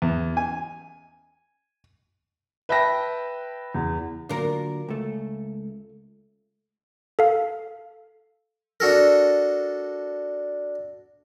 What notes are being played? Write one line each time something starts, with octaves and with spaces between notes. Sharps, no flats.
E2
G#5
B4 E5 G5 A5 B5 A#6
E2
D3 F#3 A#3 F4 A#4
C#2 A3
A4 F5
D4 F#4 A4 A#4